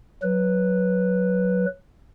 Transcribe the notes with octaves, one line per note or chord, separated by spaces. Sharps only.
F#3 B4